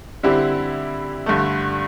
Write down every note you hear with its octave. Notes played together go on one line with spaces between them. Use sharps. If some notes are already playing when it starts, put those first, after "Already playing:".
D3 G3 C4 E4 G4
G2 D3 A3